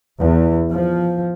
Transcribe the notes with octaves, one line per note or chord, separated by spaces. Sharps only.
E2
F3